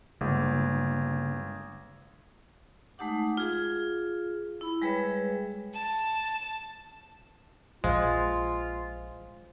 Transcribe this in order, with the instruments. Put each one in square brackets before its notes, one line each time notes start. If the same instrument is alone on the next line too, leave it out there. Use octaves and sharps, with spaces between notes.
[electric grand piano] G1 [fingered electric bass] C#3 G#3 A#3
[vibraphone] G#3 A3 D#4 G4 F#5 D6
F4 G#4 F5
E4 B5
G3 G#3 G#4 B4 C#5 E5
[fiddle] A5
[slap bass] A#1 F3 [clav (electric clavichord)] G#3 [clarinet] F4 [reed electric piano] C5 F5